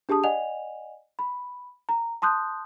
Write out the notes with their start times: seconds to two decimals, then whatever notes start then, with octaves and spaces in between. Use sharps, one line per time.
0.09 D4 G4 G#4 A5 D#6
0.24 D5 D#5 F#5 G#5 F7
1.19 B5
1.89 A#5
2.22 A5 C6 D#6 F#6 G6